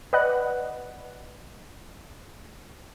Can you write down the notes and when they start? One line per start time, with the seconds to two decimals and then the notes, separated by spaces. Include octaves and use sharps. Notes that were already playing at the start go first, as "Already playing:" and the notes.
0.13 B4 D5 D#5 F#5 F#6